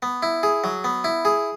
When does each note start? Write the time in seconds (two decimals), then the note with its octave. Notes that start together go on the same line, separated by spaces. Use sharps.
0.03 B3
0.23 E4
0.43 G#4
0.64 F#3
0.84 B3
1.04 E4
1.25 G#4